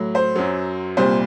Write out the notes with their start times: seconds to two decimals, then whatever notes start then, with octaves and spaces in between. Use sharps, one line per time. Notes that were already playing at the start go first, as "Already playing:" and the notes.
Already playing: A2 F#3
0.15 C5
0.36 F#2 F#3
0.97 C2 A#2 G3 C5